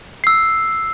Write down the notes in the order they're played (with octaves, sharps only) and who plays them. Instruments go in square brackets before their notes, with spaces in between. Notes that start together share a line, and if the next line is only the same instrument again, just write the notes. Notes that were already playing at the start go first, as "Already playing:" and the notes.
[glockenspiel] E6 C7